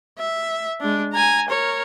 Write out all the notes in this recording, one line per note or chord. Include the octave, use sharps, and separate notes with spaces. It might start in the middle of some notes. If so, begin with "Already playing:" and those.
E5
G#3 D4
G#5 A#5
A#4 C#5